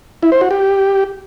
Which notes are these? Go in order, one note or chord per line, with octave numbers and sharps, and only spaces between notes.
E4
C5
F#4
G4